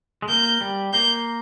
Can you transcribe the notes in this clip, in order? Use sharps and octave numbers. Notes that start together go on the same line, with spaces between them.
G#3
A#3 G6
G3
A#3 G6